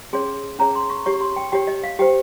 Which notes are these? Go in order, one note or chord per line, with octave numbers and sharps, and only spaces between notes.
C#4 G#4 C#5 C6
C#4 G#4 C#5 A#5
C6
C#6
G4 C#5 C#6
C6
G5
G4 C#5 G5
D#5
F5
G4 C5 G5